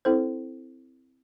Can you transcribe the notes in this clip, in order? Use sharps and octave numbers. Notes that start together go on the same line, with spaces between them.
C4 E4 A4 C5